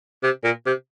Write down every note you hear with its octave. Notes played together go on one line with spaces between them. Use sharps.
C3
A#2
C3